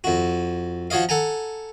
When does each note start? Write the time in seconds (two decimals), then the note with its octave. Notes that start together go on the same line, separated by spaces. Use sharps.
0.04 F2 F#4
0.90 F3 F#4 C#5 D#5 F5
1.09 A4 F#5 G#5 A#5